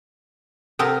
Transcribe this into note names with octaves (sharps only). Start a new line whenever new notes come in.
C3 A4 A#4 F#5 G5 D#6